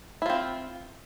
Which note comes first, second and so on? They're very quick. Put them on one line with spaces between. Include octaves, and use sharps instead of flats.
E4 F4 C4